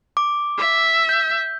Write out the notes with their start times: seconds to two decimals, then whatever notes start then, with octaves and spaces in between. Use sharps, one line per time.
0.17 D6
0.58 E5
1.09 G6